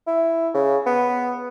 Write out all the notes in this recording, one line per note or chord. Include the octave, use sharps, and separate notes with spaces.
E4
C#3
B3